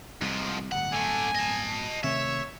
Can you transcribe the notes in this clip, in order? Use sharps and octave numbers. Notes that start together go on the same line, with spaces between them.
C2 G#2 F3
D1 G1 F#5
D3 A3 G#5
D#5 A5
C3 D#3 A3 C#5 E5